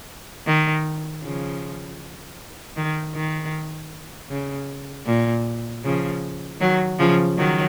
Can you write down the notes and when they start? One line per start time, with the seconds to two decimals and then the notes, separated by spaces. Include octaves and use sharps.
0.47 D#3
1.22 C#3 F3
2.77 D#3
3.14 D#3
4.30 C#3
5.06 A#2
5.84 C#3 F3
6.60 D#3 F#3
6.99 C#3 F3
7.37 D#3 F#3